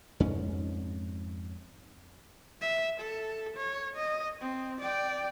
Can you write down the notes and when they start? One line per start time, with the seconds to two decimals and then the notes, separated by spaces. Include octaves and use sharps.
0.20 F2 G#2 C#4
2.61 E5
3.00 A4
3.56 C#5
3.96 D#5
4.40 C4
4.80 D5 G5